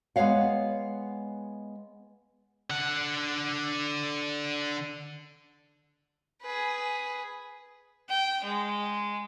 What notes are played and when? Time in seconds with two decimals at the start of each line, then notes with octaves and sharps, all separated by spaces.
0.16 G#3 B3 B4 C#5 F5 F#5
2.70 D3 F#5
6.42 G#4 B4
8.09 G5
8.44 G#3